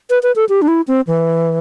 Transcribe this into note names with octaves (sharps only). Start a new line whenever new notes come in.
B4
B4
A4
G4
D4
E4
C4
E3